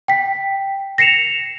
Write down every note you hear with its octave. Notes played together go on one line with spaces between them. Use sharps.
G5 B6
A#6 C7 C#7 E7 F7